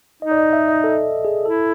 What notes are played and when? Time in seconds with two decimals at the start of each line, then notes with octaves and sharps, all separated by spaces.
0.22 D#4 D#5
0.32 D5
0.38 D#5
0.53 E5
0.68 D#5
0.84 A4
1.25 G#4
1.45 E4 A4